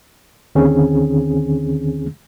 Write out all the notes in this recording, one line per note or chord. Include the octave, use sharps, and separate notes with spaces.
D#2 D3 D#3 C4 C#4 G#4